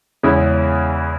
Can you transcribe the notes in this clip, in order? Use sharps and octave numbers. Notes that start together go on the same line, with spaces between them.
E2 C#3 G#3 C#4 E4